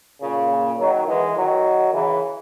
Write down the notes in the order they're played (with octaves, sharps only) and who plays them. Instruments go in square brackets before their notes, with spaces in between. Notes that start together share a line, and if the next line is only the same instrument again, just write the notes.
[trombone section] A#2 C#3
D#3 F#3
E3 G#3
D#3 F#3
C#3 E3